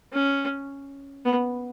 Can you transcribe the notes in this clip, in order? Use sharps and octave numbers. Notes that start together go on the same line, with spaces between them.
C#4
B3